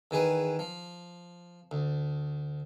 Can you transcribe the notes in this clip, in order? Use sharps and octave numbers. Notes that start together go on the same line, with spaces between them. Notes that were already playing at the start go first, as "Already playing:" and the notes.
E2 D#3 G#4 B4
F3
D2